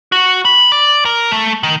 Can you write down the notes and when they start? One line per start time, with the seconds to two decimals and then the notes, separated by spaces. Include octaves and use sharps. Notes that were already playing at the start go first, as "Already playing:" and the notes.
0.12 F#4
0.45 B5
0.72 D5
1.05 A#4
1.31 A3
1.63 D#3